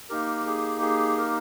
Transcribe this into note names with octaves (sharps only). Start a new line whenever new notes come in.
A#3 D#4 G4 A#4
G#4
G#4
A#4